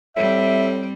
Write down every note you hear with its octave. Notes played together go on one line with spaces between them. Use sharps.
A2 G3 C4 E5